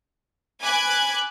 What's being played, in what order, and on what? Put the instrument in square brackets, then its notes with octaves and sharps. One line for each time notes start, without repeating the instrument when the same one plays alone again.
[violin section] G#5 B5 D6 F#6 G#6